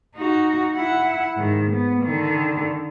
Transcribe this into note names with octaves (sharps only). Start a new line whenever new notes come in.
D#4 F#4
E4 F#5
G#2 D#3
B3
D3 D#3